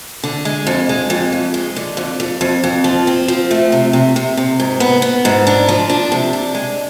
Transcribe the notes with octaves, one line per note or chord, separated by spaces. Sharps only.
D3
G#3
F2
G#3
F2
F2
G#3
D3
F2
F2
F2
F2
F3
C4
F3
A3
C3
C3
C3
C3
G#2
B3
B3
G#2
D4
F3
D4
C3
D4
G#3